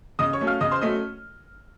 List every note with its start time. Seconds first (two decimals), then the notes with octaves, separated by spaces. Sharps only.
0.19 C#3 D#5 D#6
0.33 C#5 C#6
0.40 F#3 A3 C#4
0.47 F5 F6
0.61 C#3 D#5 D#6
0.72 C5 C6
0.81 F#3 A3 C#4 D#5 D#6